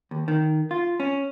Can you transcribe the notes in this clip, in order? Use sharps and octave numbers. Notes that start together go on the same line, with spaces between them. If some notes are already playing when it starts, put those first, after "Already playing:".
D#2
D#3
F4
C#4